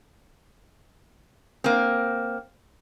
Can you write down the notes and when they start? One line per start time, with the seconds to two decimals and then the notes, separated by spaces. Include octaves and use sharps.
1.64 A#3 C4